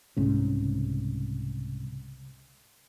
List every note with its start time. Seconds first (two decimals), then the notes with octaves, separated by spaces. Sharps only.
0.17 C2 G#2 C#3